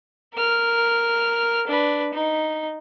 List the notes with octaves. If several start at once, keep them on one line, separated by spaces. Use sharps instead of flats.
A#4 F6
D4 B4
D#4